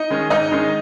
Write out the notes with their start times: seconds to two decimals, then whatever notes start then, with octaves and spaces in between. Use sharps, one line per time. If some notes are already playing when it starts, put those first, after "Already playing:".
Already playing: D#4 D#5
0.10 D#3 G#3 C#4
0.30 G#2 D#4 D#5
0.51 D#3 G#3 C#4